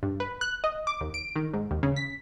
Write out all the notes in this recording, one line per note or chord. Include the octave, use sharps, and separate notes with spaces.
G2
B4
F#6
D#5
D6
D#2
D7
D#3
G#2
D#2
C#3
B6